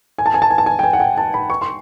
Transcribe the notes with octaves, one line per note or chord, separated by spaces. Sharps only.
G#5
A5
G#5
A5
G#5
A5
G#5
G5
G#5
F#5
G5
A5
B5
C#6
C6